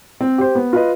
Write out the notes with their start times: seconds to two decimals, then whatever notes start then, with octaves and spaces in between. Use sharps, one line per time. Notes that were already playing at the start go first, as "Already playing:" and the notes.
0.21 C4
0.38 G4 C5
0.55 B3
0.73 F4 B4 D#5